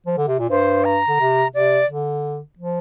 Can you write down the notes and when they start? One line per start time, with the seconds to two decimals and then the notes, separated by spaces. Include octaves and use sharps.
0.06 F3
0.18 D3
0.28 C3
0.39 A#2
0.50 G2 C5
0.85 A#5
1.08 D3
1.20 C3
1.54 C3 D5
1.90 D3
2.59 F3